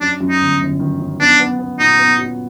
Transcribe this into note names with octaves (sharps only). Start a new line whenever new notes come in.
F#2 D4
F#2
D#4
G1
G1
D#3
F#2
B3 D4
B3
B3
A#2 D#4
B3
F#3